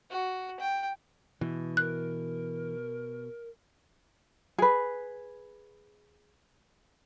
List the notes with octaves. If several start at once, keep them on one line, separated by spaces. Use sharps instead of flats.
F#4
G5
B2 E3
A#4 F#6
G#4 B4